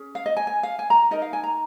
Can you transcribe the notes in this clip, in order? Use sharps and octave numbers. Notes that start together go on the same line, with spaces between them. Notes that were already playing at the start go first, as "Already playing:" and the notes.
Already playing: C#4 G#4
F5
D#5
G#5
G#5
F5
G#5
A#5
D#4 A#4 D#5
F5
G#5
A#5